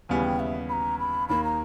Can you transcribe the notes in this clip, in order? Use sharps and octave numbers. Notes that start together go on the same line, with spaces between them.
D#2 C#3 E3 G3 B3 G#5
G5
E5
B5
A#5
B5
D#2 D#3 A#3 B5
A#5